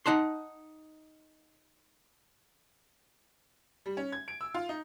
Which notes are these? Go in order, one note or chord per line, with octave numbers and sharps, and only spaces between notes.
D#4 F#5 A5 C6
G3
C#4
G#6
D7
E6
F4
D#4